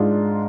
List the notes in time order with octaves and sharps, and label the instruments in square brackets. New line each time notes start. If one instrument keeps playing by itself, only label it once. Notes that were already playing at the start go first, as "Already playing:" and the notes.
Already playing: [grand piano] G#2 G#3 D4 F4